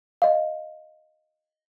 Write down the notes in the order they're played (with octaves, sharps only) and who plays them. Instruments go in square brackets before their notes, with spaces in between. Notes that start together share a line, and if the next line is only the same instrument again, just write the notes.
[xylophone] D#5 F5